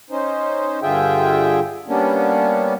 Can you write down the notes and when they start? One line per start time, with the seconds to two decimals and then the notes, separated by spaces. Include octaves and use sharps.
0.10 C#4 D#4 C5
0.82 G2 D3 F4 G#4 E5 G5
1.88 G3 A#3 B3 C#4 D4